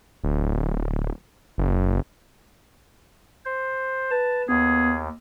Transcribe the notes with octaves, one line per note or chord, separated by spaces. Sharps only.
D1
F#1
C5
B4 A5
D#2 B3 G#4